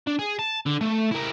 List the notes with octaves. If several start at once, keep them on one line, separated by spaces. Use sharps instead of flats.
D4
G#4
A5
D3
A3
E4 A#4